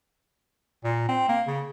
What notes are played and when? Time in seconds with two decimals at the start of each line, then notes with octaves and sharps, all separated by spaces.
0.84 A#2
1.09 C4
1.29 A#3
1.47 C#3